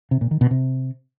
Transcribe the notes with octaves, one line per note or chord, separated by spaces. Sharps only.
C3
A#2
D#3
B2
C3